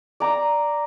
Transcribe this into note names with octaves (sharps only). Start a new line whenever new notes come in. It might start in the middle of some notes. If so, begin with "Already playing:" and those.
D5 A#5